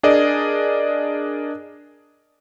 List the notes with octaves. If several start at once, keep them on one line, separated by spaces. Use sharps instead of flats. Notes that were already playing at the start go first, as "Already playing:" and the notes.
D4 G#4 A#4 D5 D#5